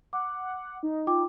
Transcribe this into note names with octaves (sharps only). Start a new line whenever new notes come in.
F#5 D6
D#4
F4 G5 D6